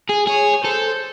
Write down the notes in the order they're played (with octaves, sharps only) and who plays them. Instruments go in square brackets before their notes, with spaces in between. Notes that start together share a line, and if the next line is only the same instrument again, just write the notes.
[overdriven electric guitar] G#4
[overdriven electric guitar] G#4 [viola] C#5
[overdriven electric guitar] A4 [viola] C5